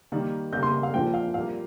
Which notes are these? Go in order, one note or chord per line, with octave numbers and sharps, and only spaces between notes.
D#3 G3 A#3
C#3 G3 A#3 G6
C6
F5
A#2 F3 G#3 G5
F5
A#2 G3 A#3 F5